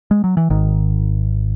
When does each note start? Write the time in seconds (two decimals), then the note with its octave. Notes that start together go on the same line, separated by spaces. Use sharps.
0.11 G#3
0.24 F#3
0.37 E3
0.50 G#1 G#2 D#3